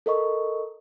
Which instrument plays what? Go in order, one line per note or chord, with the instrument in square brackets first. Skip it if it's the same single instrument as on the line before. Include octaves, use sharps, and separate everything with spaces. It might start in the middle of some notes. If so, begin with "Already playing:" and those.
[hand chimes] A4 A#4 D#5 C#6